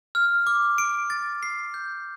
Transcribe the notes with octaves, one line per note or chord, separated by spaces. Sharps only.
F6
D6
D7
A6
C7
G6